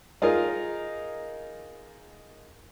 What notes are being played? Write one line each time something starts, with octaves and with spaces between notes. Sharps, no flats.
D#4 F4 G#4 A#4